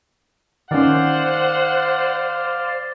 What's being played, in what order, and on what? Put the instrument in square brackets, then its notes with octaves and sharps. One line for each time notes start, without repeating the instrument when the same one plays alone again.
[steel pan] D#3 C#4 [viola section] C5 [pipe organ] D5 F5 [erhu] F#5